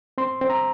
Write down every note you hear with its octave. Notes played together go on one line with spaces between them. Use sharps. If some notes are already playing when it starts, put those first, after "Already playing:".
C4 C6
C4
A#5